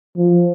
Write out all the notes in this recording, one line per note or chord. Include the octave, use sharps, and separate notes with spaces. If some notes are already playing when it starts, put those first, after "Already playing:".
F3